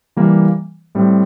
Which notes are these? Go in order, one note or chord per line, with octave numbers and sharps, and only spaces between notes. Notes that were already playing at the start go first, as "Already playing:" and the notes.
E3 G3 A#3
A2 G3 C4